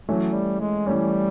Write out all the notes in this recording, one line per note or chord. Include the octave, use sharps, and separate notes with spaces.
E3 F#3 A3 C#4
G3
G#3
E3 G3 A3 C#4